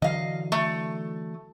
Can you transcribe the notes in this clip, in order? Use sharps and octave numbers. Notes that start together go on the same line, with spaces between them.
D3 E3 F#3 D#5 F5
A3